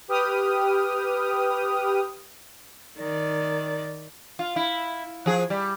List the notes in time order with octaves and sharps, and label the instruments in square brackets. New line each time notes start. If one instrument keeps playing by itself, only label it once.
[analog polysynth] G4 B4 G5 D#6 F6
[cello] D#3 D5
[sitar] F4
E4
F3 G#4
G3